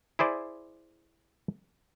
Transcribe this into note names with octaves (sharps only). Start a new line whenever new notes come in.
E4 G#4 C5 D5